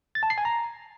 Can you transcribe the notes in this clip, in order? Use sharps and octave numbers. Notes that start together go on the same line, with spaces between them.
A6
A5
C7
G#5
A#5